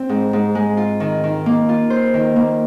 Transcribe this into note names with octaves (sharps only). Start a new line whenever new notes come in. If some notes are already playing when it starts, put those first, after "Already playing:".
Already playing: C4
G#2
G#2
G#3
F4
D#3
D#3
A#3
F4
C5
D#3
A#3